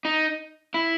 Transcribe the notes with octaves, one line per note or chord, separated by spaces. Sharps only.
D#4
E4